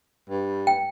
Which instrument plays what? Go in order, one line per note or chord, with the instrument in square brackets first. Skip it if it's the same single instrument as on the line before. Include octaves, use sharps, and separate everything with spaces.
[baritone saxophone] G2
[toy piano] G5